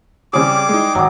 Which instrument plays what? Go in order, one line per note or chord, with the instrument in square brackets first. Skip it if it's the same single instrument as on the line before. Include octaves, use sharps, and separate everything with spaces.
[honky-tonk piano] C#3 C4 C#5 [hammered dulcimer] G3 G#4 [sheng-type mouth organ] D6
[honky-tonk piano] G#3 D#4
[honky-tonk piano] G#1 D6 [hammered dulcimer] F#3